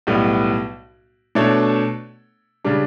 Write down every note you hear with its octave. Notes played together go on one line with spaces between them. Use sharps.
B1 A2 G3 B3
B2 A3 D4 A4 C#5
C#3 G3 D4